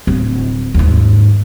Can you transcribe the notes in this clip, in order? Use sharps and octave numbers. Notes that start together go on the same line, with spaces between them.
D1
D#2 G#2